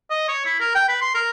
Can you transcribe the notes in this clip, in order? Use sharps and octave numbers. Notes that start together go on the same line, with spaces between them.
D#5
C#5
E4
A#4
G5
B4
C6
A#4